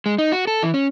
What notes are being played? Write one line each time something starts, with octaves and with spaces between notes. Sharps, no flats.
G#3
D#4
F#4
A4
E3
C#4